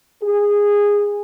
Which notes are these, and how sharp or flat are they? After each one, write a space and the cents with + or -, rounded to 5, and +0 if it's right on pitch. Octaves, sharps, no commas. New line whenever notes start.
G#4 -15